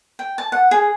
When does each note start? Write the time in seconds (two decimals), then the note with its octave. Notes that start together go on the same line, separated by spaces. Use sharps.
0.19 G5
0.38 A5
0.52 F#5
0.71 G#4